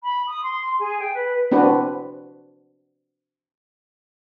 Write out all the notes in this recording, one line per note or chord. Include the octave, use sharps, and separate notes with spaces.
B5
D#6
C6
G#4
G5
B4
C4 D4 F#4 B4